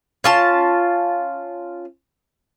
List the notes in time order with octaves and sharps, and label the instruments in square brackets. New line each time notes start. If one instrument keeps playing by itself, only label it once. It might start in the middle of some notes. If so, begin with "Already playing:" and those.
[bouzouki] C#4 F4 A5